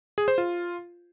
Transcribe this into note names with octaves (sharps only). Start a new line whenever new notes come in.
G#4
C5
F4